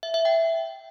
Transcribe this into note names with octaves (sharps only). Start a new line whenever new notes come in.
E5
E5
G5